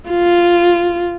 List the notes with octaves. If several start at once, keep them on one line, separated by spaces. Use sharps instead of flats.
F4